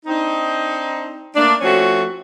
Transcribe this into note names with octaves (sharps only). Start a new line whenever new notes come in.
C4 D4 D#4
A3 A#3 D4
F3 A3 C4 C#4 F#4